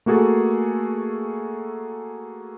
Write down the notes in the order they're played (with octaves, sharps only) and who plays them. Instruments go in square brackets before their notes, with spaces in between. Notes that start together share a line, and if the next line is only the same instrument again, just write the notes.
[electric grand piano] A3 A#3 F#4 G#4 A4